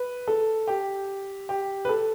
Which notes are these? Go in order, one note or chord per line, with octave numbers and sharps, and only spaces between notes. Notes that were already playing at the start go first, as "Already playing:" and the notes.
Already playing: B4
A4
G4
G4
B4
A4